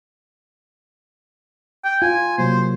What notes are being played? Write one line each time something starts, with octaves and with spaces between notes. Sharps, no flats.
G5
F4 G#5
C3 F#3 A#3 C5